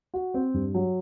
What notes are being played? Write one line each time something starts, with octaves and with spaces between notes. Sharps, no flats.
F#4
C4
G2
F#3